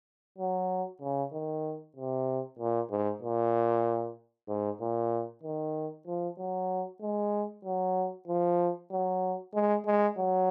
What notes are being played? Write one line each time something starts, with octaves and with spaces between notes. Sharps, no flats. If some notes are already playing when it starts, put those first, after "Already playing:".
F#3
C#3
D#3
C3
A#2
G#2
A#2
G#2
A#2
D#3
F3
F#3
G#3
F#3
F3
F#3
G#3
G#3
F#3